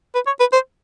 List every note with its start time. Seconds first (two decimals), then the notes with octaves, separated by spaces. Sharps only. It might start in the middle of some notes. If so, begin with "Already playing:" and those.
0.15 B4
0.26 C#5
0.40 B4
0.52 C5